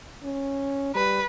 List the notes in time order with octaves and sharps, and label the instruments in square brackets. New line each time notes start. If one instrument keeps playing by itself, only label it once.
[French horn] C#4
[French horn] G3 [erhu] B4